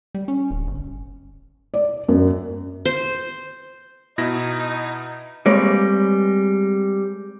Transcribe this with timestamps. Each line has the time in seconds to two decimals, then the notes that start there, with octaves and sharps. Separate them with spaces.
0.15 G3
0.28 C#4
0.51 D1
0.67 G1
1.74 D5
2.08 F#2
2.85 C5
4.18 B2 D#4 E4 A#6
5.46 G3 G#3 A#3 C4 B4 C#5